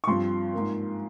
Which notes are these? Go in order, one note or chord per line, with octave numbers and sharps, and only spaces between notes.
C#6
G2 F3 C4 C6
G#2 F3 A#3